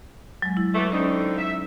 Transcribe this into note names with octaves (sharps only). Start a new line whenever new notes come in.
F#3 G#3
E4
E3 F#3 A3
D3 C4 C#4 D#4
E5